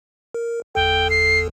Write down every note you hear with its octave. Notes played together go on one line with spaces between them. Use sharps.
A#4
G1 E2 A4 G5
C7